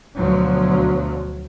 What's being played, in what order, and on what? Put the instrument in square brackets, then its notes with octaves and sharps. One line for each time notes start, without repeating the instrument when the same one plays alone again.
[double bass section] D2 B2 F3 F#3